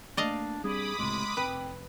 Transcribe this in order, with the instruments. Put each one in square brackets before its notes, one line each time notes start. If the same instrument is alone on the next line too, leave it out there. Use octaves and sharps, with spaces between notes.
[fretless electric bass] A3 A#3 [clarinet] D4 [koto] D5 D#5 F5
[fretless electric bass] G3 C4 D4 [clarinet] G#4 [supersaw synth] B5 D6 D#6
[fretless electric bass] C#2 A2 C3 [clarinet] G#3
[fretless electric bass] F1 [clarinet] C4 [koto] B4